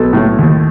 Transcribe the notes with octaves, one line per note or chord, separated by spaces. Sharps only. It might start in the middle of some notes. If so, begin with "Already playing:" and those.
Already playing: B1 A4
A2
D#2